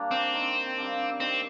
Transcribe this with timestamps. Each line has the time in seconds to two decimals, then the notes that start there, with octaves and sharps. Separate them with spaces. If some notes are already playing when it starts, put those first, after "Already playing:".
Already playing: G3 A#3 D4
0.11 C4
0.34 D#3
0.78 G3 A#3 D4
1.20 D#3 C4